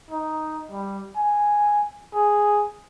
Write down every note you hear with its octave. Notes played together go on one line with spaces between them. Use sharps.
D#4
G3
G#5
G#4